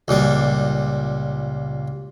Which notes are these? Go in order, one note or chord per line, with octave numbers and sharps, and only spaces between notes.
C#2 A#2 G3